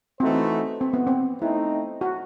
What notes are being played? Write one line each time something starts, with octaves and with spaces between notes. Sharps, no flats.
E3 A3 C4 D#4 F#4 C5
C4
B3
C4
A3 C4 D#4 E4
F#4